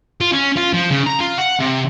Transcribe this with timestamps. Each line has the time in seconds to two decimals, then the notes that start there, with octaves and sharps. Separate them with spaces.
0.21 F4
0.32 C#4
0.56 F4
0.73 F3
0.91 C#3
1.06 A#5
1.20 F4
1.38 F#5
1.60 C3